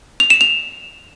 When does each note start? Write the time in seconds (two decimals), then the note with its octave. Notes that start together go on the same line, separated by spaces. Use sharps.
0.20 F7
0.30 E7
0.41 F7